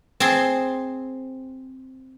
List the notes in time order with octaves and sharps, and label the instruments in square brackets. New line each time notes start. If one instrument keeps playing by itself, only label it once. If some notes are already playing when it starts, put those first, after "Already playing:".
[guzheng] C4 G#4 A5 C6